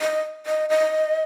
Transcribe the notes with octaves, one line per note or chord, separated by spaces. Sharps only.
D#5
D#5
D#5